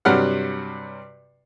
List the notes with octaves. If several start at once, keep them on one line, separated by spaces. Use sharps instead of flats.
G2 C3 F#3 F#5 F6